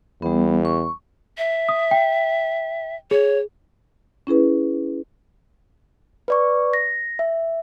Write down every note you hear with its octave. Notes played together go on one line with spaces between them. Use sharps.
E2 G3 B3
C#6
E5
D#6
G5
G#4 C#5
C#4 E4 G#4 B4
B4 D5 C#6
A#6
E5